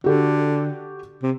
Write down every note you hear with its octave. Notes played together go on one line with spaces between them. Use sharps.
D3 F#4 G4 A4
C3